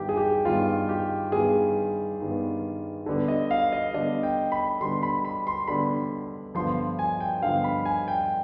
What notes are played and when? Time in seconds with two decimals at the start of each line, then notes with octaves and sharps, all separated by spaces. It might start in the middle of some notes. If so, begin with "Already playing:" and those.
Already playing: G2 D#3 G3 B3 G4
0.09 G#4
0.17 G4
0.45 G2 D#3 G3 B3 F4
0.89 G4
1.32 G2 D#3 G3 B3 G#4
2.20 G2 D#3 G3 B3
3.06 D3 G3 B3 D4
3.28 D#5
3.51 F5
3.72 D#5
3.94 D3 G3 B3 D4 D#5
4.23 G5
4.52 B5
4.81 D3 G3 B3 D4 C6
5.03 B5
5.25 B5
5.47 C6
5.67 D3 G3 B3 D4 B5
6.55 G2 D3 F3 B3 C6
6.99 G#5
7.20 G5
7.42 G2 D3 F3 B3 F5
7.64 B5
7.85 G#5
8.08 G5